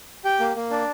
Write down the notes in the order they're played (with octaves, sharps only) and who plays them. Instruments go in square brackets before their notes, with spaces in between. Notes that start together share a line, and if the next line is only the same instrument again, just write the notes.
[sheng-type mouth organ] G4 G5
A#3
A#3
D4